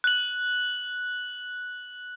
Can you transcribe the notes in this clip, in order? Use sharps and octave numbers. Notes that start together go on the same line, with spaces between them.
F#6 F#7